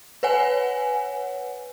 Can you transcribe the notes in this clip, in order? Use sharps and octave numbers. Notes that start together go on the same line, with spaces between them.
B4 C#5 F#5 G#5